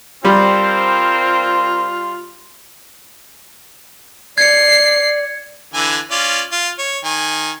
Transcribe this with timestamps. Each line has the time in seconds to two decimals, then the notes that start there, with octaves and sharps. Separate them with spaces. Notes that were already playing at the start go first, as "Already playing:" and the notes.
0.25 G3 C4 F4 A#4 C5
4.38 D5 G#6 C7 C#7
5.74 D3 E3 G#5
6.11 C#4 F4 D5
6.52 F4
6.78 C#5
7.04 D#3 G#5